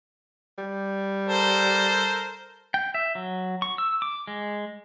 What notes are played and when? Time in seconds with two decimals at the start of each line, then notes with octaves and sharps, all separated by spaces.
0.58 G3
1.28 A4 A#4 C5
2.74 G5
2.94 E5
3.15 F#3
3.62 C#6
3.78 E6
4.02 D6
4.27 G#3